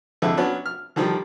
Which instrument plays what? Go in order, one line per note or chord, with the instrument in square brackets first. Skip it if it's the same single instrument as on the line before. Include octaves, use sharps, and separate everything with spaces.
[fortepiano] F2 D3 G#3 E4
F#3 B3 C#4 D4
F6
D3 D#3 F3 G3